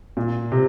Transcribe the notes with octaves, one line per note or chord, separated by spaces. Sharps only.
A#2
C3